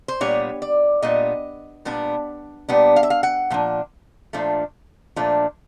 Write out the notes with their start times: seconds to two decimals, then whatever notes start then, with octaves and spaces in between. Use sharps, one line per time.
0.08 C5
0.21 A#2 G3 B3 D4 C#5
0.62 D5
1.02 A#2 G3 B3 D4 D#5
1.85 A#2 G3 B3 D4
2.69 A#2 G3 B3 D4
2.96 F5
3.03 E5
3.10 F5
3.23 F#5
3.50 A#2 F3 D4
4.33 A#2 F3 A3 D4
5.16 A#2 F3 A3 D4